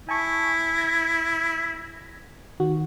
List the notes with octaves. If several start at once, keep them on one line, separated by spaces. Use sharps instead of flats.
E4 G#5 A5 C#6
G#6 A#6
D#3 F#4